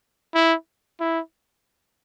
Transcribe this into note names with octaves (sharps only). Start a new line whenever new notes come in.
E4
E4